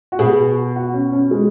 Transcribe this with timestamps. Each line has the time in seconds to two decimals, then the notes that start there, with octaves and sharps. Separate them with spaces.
0.12 F#4
0.19 B2 G#4
0.76 F#4
0.94 C#4
1.12 C#4
1.31 G#3